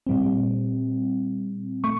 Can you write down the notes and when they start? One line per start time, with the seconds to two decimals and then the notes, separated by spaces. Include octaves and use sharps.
0.07 A#2 G3 C4
1.84 A3 C#6